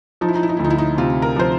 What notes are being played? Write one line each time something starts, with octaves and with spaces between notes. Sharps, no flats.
F3 D#4
E4
D#4
E4
D#4
D2 E4
D#4
E4
D#4
C3 F4
A#4
F3 C5